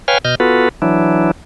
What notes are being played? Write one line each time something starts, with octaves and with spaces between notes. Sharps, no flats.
B4 C#5 F5 G5 G#5 F6
B2 D#5 F6 G6
B3 F4 F#4 A4 B4
E3 F#3 D4 E4